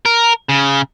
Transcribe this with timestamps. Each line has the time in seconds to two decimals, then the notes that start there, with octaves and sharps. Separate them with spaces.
0.05 A#4
0.49 C#3